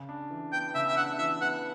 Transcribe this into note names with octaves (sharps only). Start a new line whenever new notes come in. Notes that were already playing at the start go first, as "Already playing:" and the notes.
Already playing: C#3
D4
E3
B3 G5
C#3 E5
E5
D4 F#5
E3 E5
B3 F#5